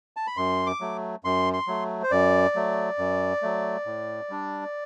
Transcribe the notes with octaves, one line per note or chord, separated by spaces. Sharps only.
A5
B5
F#2 C6
D6
F#3 A3
F#2 C6
C6
F#3 A3
C5
F#2 D5
F#3 A3
F#2
F#3 A3
A2
G3 D4